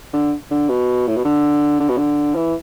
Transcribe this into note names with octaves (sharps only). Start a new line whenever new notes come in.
D3
D3
B2
A2
B2
D3
D3
B2
D3
E3